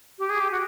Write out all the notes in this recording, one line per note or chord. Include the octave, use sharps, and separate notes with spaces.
G4
G#4
G4
F#4